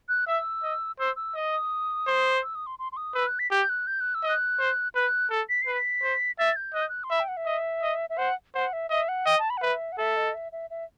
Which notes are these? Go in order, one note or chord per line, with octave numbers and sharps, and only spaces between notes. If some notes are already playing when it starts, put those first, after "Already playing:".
F#6
E5 E6
D#5
C5 E6
E6
D#5 D#6
C5
E6
D#6
C6
C6
C6
D#6
B4 E6
F#6
B6
G4 G6
F#6
G6
F#6
E6
D#5
F#6
C5
B4 F#6
A4
B6
B4 C7
B6
C5
E5 A6
G6
D#5 F#6
G6
F#6
C6
E5 B5
G5
F#5
E5
D#5
D#5
E5
C5 F#5
C5 F#5
E5
D#5 E5
F#5
D#5 G5
A5
B5
F#5
B4 E5
F#5
A4 E5
D#5
E5
E5
E5